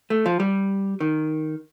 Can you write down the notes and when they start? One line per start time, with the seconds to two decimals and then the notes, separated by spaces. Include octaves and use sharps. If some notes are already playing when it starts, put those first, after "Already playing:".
0.10 A3
0.26 F3
0.40 G3
1.00 D#3